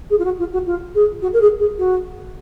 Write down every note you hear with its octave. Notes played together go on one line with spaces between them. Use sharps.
G#4
F4
F#4
F4
F#4
F4
G#4
F#4
A#4
G#4
G#4
F#4